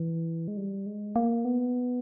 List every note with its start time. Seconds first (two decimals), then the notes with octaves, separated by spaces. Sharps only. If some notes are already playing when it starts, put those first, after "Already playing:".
Already playing: E3
0.48 G#3
0.57 G3
0.86 G#3
1.16 A#3
1.45 B3